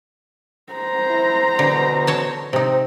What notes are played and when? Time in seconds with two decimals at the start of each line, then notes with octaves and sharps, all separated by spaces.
0.73 C5 A#5
1.09 E4
1.59 B2 D3
2.07 A4 C#5 A5
2.53 C3 C4 D#4